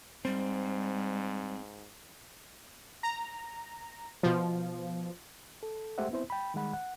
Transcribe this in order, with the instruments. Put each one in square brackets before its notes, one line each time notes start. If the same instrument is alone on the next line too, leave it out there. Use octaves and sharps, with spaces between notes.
[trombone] G#2 [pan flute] G3 [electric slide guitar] C4
[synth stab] A#5
B2 F3
[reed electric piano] A4
G#3 A3 G4 C5 E5 F#5
B3 C4 E4 C5
G5 B5
D#3 G3 G#3 F#5 B5
F#5